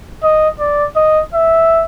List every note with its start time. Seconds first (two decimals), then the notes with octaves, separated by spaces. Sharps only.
0.23 D#5
0.60 D5
0.96 D#5
1.34 E5